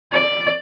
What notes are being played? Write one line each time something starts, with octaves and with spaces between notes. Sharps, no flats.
D5